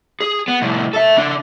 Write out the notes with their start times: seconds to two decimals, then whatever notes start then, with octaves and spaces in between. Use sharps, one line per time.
0.21 G#4
0.48 B3
0.62 C2 A2
0.93 A4 E5
1.16 C#3 D4